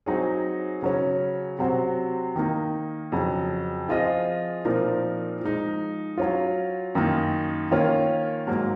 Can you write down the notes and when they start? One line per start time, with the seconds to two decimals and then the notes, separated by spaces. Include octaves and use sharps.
0.06 F#3 C4 D#4 G#4 C#5
0.82 C#3 F#3 C#4
1.59 C3 F#3 C4 F#4 C5
2.36 D#3 A#3 D#4
3.12 F2 C#3 F#3
3.89 F3 C4 F4 G#4 D#5
4.65 A#2 F3 C4 D#4 A#4
5.41 F3 G#3 D#4
6.18 F#3 C#4 F4
6.95 F#2 D#3 A#3 D#4
7.71 D#3 A#3 C#4 F4 A#4
8.47 G#2 F#3 A#3